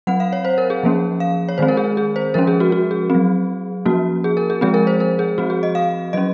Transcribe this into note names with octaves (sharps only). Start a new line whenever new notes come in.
F#3 C4 F#5
F5
C#5
C5
A#4
G#4
F3 A#3 C#4
F5
C#5
D#3 G#3 C4 C5
A#4
G#4
G#4
C5
F3 G#3 C#4 A#4
G#4
F#4
F#4
G#4
F#3 C4
F3 A#3 C#4 F#4
G#4
A#4
G#4
F3 G#3 C4 G#4
A#4
C5
A#4
G#4
F3 C4 F#4
G#4
D#5
F5
F#3 C#4 D#5